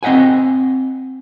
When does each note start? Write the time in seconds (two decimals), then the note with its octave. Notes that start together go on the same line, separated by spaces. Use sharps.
0.03 C4 D#5 E5 F#5 G#5